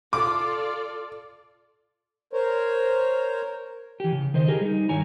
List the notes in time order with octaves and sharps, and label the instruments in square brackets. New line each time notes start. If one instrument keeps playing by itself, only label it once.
[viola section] F4 A4 D5 [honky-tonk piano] D6
[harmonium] A#4 C5 C#5
[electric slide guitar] E3 G4
C#3
D#3 C5 D#5
G4 G#4 A#4
G3 D#4
G2 D#3 E4 C#5 G#5 A#5